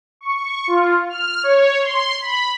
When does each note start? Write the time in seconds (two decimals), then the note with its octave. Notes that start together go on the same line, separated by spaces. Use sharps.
0.21 C#6
0.67 F4
1.09 F6
1.43 C#5
1.83 C6
2.22 B5